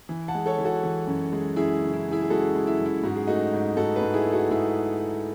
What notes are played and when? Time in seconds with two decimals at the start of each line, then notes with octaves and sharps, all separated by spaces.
0.09 E3
0.28 F#5 A5
0.35 G#3
0.46 A4 C#5
0.58 E3
0.65 F#4 A4
0.83 E3
1.07 F#2
1.32 G#3
1.56 F#2 E4 G#4
1.82 C#3
1.93 E4
2.05 C#3
2.11 E4 G#4
2.22 G#4
2.30 G#3 F#4 A4
2.55 G#3
2.67 E4
2.80 F#2
2.86 E4
3.03 G#2 F#4
3.16 G#4
3.27 A3 D#4 F#4
3.53 G#2
3.77 G#2 F#4 A4
3.95 G#4 B4
4.02 G#2
4.14 E4 G#4
4.26 A3
4.32 F#4 A4
4.50 G#2 E4 G#4